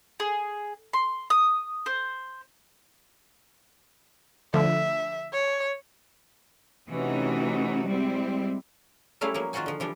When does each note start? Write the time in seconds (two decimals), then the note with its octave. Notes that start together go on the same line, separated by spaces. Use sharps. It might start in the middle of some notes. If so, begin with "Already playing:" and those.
0.20 G#4
0.93 C6
1.30 D#6
1.86 C5
4.54 D3 F3 A3 E5
5.33 C#5
6.89 C3 E3 A3 C#4 D#4 F#4
7.87 G3 G#3 C4 E4
9.21 F#3 G3 A3 C#4 E4 F5
9.34 F3 F#3 A#3
9.53 D#3 F4 F#4 C5 F#5 G#5
9.66 D3 F3
9.80 E3 F3 G3 D4